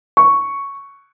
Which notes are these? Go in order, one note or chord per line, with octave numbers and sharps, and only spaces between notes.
C#6